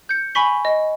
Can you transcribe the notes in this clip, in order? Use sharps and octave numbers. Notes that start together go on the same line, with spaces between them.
G6 C#7
G#5 B5 C#6 B6 G7
D#5